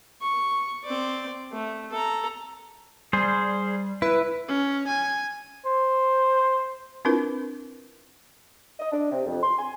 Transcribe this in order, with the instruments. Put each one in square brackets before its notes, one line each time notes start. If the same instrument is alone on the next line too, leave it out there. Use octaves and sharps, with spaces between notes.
[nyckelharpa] C#6
C4 D5
A3
A4 A#5
[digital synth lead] G3 [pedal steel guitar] G#4 C5
[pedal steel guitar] E4 [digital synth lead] B4
[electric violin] C#4
G#5
[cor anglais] C5
[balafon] C4 D4 E4 F4 A#4 B4
[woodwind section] D#5
D4
C3
F2
C6
G#5